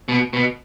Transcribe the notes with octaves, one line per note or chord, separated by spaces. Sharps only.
B2
B2